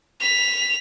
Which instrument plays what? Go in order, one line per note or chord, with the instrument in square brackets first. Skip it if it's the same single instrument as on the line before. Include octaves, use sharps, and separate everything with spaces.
[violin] B6 F7